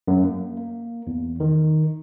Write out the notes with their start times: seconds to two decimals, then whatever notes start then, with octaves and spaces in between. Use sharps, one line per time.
0.08 F#2
0.23 A#3
0.57 A#3
1.07 E2
1.40 D#3